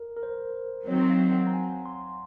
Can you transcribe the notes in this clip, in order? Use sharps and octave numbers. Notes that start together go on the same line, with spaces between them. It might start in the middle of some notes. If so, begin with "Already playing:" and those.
Already playing: A#4
A#4
C5
D#3 F#3 C4 C#5
F5
F#5
A#5
G#5
C6